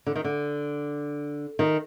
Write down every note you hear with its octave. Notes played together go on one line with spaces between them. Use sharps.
D3
D#3
D3
D#3